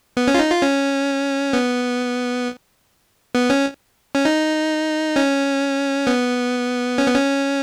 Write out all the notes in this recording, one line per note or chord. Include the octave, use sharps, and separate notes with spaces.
B3
C#4
F4
D#4
F4
C#4
B3
B3
C#4
C#4
D#4
C#4
B3
C#4
B3
C#4